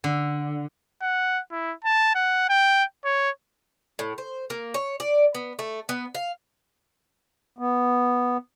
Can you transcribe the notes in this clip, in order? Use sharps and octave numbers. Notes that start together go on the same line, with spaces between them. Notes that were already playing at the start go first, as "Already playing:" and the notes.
D3
F#5
E4
A5
F#5
G5
C#5
A2
C5
A#3
C#5
D5
B3
A3
B3
F5
B3